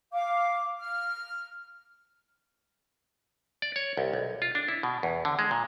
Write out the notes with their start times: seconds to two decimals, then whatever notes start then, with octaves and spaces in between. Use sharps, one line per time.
0.13 F5 D6
0.79 F6
3.62 D5
3.76 C#5
3.97 C2
4.13 B1
4.42 F4
4.55 D4
4.68 E4
4.83 B2
5.03 E2
5.25 D3
5.39 G#3
5.51 A#2